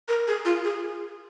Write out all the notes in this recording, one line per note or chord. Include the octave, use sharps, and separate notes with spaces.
A#4
G#4
F4
G#4